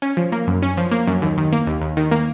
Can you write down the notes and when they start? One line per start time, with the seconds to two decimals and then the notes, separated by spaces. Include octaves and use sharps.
0.02 C#4
0.17 F3
0.32 A#3
0.47 F#2
0.62 C#4
0.77 F3
0.91 A#3
1.07 F#2
1.22 D#2
1.38 D#3
1.53 A#3
1.67 D#2
1.81 D#2
1.97 D#3
2.11 A#3